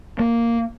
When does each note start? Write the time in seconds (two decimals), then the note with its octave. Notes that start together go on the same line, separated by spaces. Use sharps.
0.19 A#3